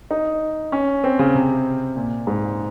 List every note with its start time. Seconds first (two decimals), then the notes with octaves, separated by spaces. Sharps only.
0.11 D#4
0.72 C#4
1.04 C4
1.19 C#3
1.35 C3
1.96 A#2
2.27 G#2